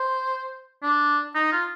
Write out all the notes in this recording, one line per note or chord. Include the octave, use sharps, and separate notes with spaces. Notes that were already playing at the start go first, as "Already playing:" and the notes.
Already playing: C5
D4
D#4
F4